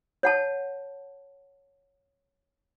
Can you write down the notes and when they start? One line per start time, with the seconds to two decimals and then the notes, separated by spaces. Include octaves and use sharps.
0.23 C#5 F#5 A5